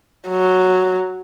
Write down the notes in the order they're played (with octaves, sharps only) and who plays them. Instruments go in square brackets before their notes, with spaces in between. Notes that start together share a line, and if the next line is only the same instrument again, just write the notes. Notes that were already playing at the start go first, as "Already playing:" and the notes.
[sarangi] F#3